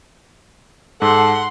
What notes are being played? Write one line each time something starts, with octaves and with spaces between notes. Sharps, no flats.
G#2 A4 F#5 C6